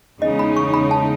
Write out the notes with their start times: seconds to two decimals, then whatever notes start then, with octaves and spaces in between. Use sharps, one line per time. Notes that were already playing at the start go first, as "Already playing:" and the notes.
0.22 E2 C#3 G#3 D#4 D#5
0.39 B5
0.56 C#6
0.74 B5
0.91 A5